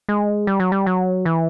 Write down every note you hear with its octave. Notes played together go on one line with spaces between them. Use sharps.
G#3
G3
F#3
G3
F#3
E3